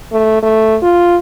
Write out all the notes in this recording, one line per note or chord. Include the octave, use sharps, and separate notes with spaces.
A3
A3
F4